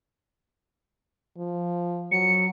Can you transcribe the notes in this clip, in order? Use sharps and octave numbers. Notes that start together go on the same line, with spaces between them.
F3
F#3 C#7